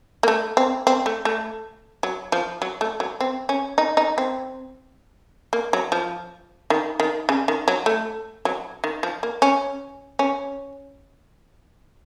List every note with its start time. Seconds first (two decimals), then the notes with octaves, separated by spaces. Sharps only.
0.23 A#3
0.28 A3
0.57 C4
0.87 C4
1.06 A3
1.25 A3
2.03 F#3
2.32 F3
2.62 F#3
2.81 A3
3.00 F#3
3.21 C4
3.49 C#4
3.78 D#4
3.97 D#4
4.18 C4
5.53 A#3
5.73 F#3
5.92 F3
6.70 D#3
7.00 D#3
7.29 C#3
7.48 D#3
7.68 F#3
7.86 A3
8.45 F#3
8.84 D#3
9.03 F3
9.23 A#3
9.42 C#4
10.19 C#4